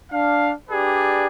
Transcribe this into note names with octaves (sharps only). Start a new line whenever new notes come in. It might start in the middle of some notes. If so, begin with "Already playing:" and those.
D4 F5
D4 G4 G#4 B4 D5